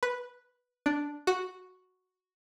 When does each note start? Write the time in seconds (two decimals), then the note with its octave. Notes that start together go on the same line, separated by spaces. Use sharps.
0.03 B4
0.86 D4
1.27 F#4